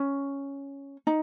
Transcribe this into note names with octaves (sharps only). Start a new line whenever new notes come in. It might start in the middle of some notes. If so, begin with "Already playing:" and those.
Already playing: C#4
D#4